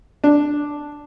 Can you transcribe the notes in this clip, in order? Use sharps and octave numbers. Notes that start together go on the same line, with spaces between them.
D4